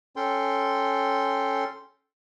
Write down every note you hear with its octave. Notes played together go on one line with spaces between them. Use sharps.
C#4 A4 G5 C6